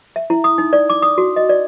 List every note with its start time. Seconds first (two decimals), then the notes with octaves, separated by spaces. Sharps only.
0.16 E5
0.30 E4
0.44 D#6
0.58 D#4
0.73 D5
0.90 D6
1.02 D#6
1.18 F#4
1.36 D#5
1.49 D5